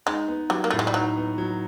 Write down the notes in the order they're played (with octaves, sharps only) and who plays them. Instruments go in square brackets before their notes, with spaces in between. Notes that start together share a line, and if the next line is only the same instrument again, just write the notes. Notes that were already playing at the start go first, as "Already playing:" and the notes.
[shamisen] G#3 [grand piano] D#4
[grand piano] B3
[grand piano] F#3 [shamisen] G3
[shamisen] A#3
[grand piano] A2 [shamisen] A3
[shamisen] G#3
G3
[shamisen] F#3 [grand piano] D#4
[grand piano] B3
F#3